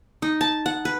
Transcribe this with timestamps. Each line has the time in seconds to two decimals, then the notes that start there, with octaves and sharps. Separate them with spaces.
0.22 D#4
0.41 A5
0.66 F#5
0.85 B4